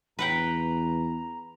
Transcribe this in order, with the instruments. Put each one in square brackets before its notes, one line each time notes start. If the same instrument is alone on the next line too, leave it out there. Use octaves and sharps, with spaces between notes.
[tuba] E2 [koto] B4 F#5 G5 [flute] A#5 [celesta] B5